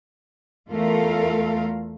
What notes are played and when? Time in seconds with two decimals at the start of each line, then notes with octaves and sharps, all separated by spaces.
0.70 E2 A3 F4 A4 A#4 F5